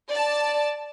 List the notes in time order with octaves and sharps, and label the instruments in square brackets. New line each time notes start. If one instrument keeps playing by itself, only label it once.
[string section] D5 A5